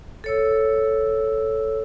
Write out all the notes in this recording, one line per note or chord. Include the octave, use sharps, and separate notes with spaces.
A4 C#5 E6